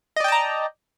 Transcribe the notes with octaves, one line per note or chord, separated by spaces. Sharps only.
D5 D#5 G5 A5 A#5